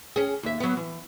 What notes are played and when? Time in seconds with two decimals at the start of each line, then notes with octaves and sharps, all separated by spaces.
0.16 C#4 G#4
0.43 D#2 E5
0.60 F#3 B3
0.77 E3